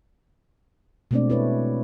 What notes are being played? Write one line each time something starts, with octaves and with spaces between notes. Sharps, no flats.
B2 G#3 A3 C4 D4 D5
E4 B4 C#5